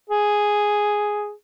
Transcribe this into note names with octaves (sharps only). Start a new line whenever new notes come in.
G#4